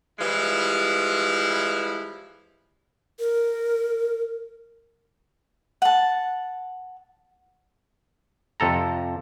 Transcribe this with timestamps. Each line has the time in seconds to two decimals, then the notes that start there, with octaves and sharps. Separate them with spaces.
0.19 E3 F3 G3 G#3 E4
3.20 A#4
5.82 F#5 A5
8.60 F2 C3 A4 A#5